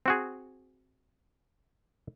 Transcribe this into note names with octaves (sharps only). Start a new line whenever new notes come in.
C4 F#4 G#4